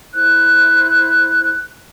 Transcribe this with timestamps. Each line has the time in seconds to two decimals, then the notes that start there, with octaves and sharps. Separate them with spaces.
0.14 E4 C5 F#6